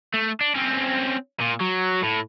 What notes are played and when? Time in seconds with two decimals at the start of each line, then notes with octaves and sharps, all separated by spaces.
0.14 A3
0.41 D4
0.55 C4 C#4
1.40 A#2
1.60 F#3
2.03 A2